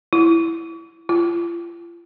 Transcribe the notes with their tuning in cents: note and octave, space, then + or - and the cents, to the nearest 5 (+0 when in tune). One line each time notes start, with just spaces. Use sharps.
E4 +10
F4 -40